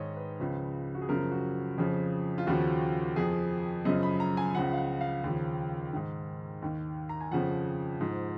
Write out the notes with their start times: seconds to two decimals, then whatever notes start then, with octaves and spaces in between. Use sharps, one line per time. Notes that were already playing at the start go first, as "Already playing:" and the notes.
Already playing: G#2 D#3 C#5 D#5
0.17 B4
0.40 C#2 C#3 F3
0.95 F#4
1.02 G#4
1.09 F#2 C#3 F3 A#4
1.32 F#4
1.78 F2 C#3 F3
2.38 F4
2.47 D#2 C#3 F3 F#4
3.16 F2 F3 G#4
3.85 F#2 C#3 F3 D#5
4.03 B5
4.20 A#5
4.37 G#5
4.54 C#2 C#3 F3 F#5
4.73 F5
4.77 F#5
5.01 F5
5.24 D#2 C#3 F3
5.93 G#2 D#3
6.62 D#2 D#3
7.09 A#5
7.21 G#5
7.31 F2 C#3 F3 F#5
8.01 G#2 F3